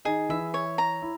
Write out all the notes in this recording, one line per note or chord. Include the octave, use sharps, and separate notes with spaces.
D#3 D#4 G#4
E3 E4 E5
C#5
A#5
E4